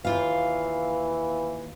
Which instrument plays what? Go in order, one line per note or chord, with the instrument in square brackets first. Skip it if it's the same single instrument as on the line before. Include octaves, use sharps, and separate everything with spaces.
[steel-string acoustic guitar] D#2 F4 F5 [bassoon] E3